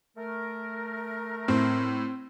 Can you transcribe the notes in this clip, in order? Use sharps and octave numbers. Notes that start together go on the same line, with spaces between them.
A3 A#4
A2 C4